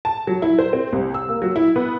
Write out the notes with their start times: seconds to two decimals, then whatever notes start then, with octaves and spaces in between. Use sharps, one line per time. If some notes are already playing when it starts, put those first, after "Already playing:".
0.05 A5
0.27 F#3
0.42 E4
0.59 C5
0.73 C4
0.92 C2
1.14 E6
1.29 A#3
1.42 F#3
1.56 E4
1.76 B3